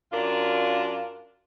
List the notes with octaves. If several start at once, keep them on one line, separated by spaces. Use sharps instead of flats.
F#2 D4 F4 A#4